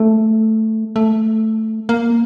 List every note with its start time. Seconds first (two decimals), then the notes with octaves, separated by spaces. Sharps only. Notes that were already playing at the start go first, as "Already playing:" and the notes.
Already playing: A3
0.96 A3
1.89 A#3